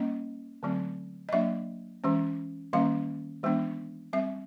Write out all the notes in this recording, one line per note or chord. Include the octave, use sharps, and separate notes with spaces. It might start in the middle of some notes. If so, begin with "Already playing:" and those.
Already playing: G3 A#3 C#4 D#5
D3 F#3 A3 C4
D#5
F#3 A#3 D4 E5
E3 G#3 C#4
D#3 G3 A#3 C#4 F5
E3 G#3 B3 D4
G3 C4 E5